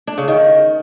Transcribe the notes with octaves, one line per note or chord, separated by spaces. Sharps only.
D4
C#3
D#3